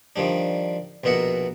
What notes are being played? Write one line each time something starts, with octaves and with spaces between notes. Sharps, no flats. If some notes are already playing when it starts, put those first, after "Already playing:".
D#3 F3 G3 D4
A#1 B2 B3 A#4 E5 F#5